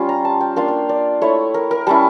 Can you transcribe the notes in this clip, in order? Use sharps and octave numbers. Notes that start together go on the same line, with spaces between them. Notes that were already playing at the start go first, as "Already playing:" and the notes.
Already playing: G3 C#4 F4
A#5
A5
G5
A#3 D4 F4 F5
F5
D5
A3 E4 C#5
A#4
A#4
G3 C#4 E4 A5